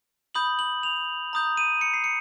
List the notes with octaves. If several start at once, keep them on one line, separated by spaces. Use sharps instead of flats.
B5 D#6 G6 F#7
F#7
F7
A#5 D#6 G6
D#7
C#7
C7
C#7